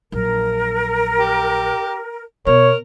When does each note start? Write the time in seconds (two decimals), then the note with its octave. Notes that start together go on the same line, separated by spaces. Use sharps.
0.12 A#1 F#3 A#4
1.18 G4
2.47 B2 A#4 C#5